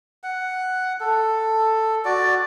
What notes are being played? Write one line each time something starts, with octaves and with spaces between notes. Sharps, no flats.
F#5
A4
F#4 D5